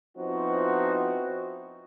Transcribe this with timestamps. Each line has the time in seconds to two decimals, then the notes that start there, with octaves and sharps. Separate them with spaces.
0.17 F3 B3 C4 D#4 E4 F#4